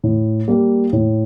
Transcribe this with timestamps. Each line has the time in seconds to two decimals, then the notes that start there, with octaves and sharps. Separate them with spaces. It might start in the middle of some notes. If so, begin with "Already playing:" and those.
0.03 A2
0.48 G3 A#3
0.93 A2